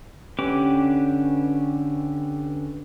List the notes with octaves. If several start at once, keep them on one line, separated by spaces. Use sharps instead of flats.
D3 C#4 G4 B4 D6